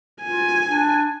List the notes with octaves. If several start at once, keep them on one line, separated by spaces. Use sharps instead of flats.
F4 G#5
D4